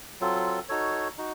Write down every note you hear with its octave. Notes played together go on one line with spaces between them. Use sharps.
F#3 C4 F4 A4
D#4 F#4 A4 C#5
D#4 F#4